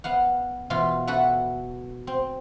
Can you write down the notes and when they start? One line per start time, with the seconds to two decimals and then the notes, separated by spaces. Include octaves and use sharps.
0.04 B3 F5 F#5
0.70 B2 E3 F4
1.07 F#4 A4 B4 E5 F#5
2.07 C4